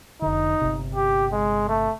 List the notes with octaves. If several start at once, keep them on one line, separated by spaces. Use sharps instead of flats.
F1 D3 D#4
G1 C3
G4
G#3
A3